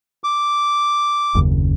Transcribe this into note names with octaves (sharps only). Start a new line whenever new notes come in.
D6
F#1 D#2 C#3